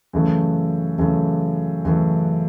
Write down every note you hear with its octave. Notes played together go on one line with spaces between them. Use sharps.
F#2 C#3 E3 A3
F#2 C#3 E3 A3
F#2 C#3 E3 A3